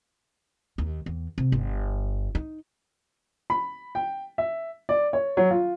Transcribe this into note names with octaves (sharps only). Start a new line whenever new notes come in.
D#2
E2
C3
G1
D#4
B5
G5
E5
D5
C#5
F#3
F4